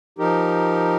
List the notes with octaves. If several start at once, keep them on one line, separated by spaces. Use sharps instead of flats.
F3 D#4 G4 A#4